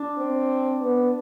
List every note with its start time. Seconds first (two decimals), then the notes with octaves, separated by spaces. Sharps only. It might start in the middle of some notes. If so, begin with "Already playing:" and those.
Already playing: D4
0.18 C4
0.81 B3